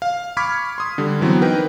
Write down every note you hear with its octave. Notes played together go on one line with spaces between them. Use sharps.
F5
B5 C#6 D6 F6 G#6 B6
C6 D#6
D3 G3
E3 F#3 B3 C4
D#4 A#4 B4 G5